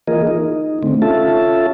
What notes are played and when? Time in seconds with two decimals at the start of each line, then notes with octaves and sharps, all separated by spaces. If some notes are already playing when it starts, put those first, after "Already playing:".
0.07 E3 A#3 F4 G#4 A#4 D#5
0.27 D#4
0.83 D3 A3 C4
1.02 C#4 F4 A4 E5 A5